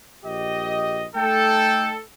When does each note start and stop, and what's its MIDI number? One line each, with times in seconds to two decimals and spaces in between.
0.25 1.05 34
0.25 1.05 67
0.25 1.05 75
1.16 1.98 57
1.16 1.98 63
1.16 1.98 69
1.16 1.92 79